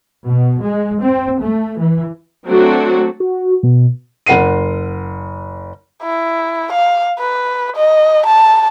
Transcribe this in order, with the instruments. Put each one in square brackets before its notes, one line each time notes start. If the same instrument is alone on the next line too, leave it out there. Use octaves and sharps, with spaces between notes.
[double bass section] B2
G#3
C4
A3
E3
[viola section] F#3 A3 C4 D4 F#4
[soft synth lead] F#4
B2
[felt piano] F#1 A#4 F#5 C7 D#7
[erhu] E4
F5
B4
D#5
A5